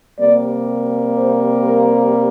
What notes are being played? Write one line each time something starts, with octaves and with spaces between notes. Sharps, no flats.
C3 G3 A#3 D5
C5
A#4